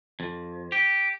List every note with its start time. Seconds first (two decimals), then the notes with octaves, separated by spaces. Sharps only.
0.20 F2
0.72 G4